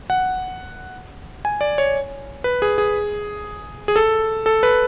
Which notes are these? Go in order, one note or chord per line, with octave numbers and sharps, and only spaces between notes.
F#5
G#5
D5
C#5
B4
G#4
G#4
G#4
A4
A4
B4